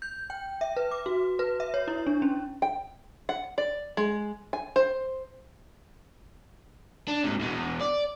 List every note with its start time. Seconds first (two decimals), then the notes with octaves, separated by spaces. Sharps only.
0.02 G6
0.30 G5
0.61 E5
0.77 B4
0.91 D6
1.06 F#4
1.39 B4
1.60 E5
1.74 C#5
1.88 E4
2.07 D4
2.22 C#4
2.62 G5
3.29 F#5
3.58 D5
3.97 G#3
4.53 G#5
4.76 C5
7.08 D4
7.24 G#2 C3
7.41 E2 B2
7.81 D5